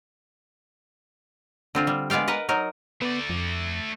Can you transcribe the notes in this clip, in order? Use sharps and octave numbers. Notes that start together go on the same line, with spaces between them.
D3 C4 F4
G3
G#3 B3 D5 F5 G5
A#4 B4 D#5 F#5
F#3 D#4 A#4
A3 B3 D5
F2